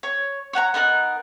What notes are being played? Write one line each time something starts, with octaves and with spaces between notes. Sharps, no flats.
C#5
C#5 F#5 A5 A#5
B3 D#4 A#4 F#6